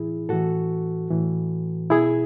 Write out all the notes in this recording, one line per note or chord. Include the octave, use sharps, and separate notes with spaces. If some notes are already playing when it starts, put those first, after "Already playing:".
Already playing: A2 E3 E4 G#4
A2 E3 F#4 A4
A2 E3
B2 E4 G#4